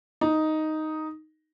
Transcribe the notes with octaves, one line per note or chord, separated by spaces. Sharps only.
D#4